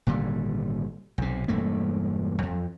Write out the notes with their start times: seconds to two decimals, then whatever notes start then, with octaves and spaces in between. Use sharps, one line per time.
0.07 G#1 A#2 D3 G3
1.18 B1 C3
1.48 E1 G2 A3 A#3
2.43 F2